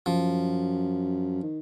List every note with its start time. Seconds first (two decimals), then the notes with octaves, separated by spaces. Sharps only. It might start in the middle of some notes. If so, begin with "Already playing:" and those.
0.06 F#2 F3
1.43 D#3